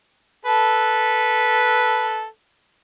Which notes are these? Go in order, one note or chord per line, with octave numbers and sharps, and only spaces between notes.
A4 B4